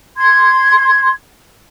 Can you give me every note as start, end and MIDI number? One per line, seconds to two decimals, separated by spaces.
0.16 1.09 84
0.16 1.09 92